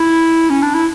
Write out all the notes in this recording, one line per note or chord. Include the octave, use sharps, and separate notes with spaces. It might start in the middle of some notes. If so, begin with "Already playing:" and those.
Already playing: E4
C#4
D4
E4